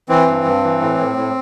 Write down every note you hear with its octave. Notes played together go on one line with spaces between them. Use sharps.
E3 C4
G2
G2
E3
A2
A2
A2